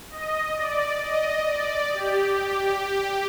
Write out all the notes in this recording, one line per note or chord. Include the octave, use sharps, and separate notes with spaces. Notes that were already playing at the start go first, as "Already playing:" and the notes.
D#5
D5
D#5
D5
G4